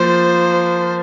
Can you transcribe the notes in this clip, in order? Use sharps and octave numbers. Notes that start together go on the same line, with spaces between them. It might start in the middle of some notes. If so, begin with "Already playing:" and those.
Already playing: F3 A#3 F4 C5